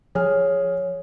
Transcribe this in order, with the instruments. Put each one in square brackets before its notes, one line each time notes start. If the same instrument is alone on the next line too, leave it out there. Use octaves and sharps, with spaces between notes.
[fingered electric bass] F3 [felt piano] G#4 G#5 F6 [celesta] C#5